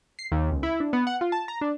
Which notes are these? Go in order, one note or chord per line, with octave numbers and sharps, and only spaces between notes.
C7
D#2
C#2
E4
D4
B3
F#5
F4
A5
A#5
D4